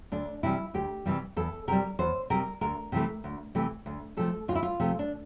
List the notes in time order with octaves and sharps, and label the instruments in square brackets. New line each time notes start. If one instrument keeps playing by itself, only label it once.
[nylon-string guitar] D2 D4
C3 E3 G3 E4
D2 G4
C3 E3 G3
E2 A4
C3 G3 A#4
E2 C5
C3 G3 A#4
D2 A#4
C3 E3 A3
D2
C3 E3 A3
D2
C3 F3 A3 A4
D2 F4
E4
F4
C3 F3 A3
D4